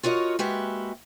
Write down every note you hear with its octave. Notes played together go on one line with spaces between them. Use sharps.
F4 F#4 A#4 C#5 D#5
G#3 A#3 F#4 G4 B4 E5